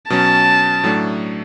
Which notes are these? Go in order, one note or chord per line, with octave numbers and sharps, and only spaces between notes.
B2 F#3 C#4 A5
A2 F#3 A3 D4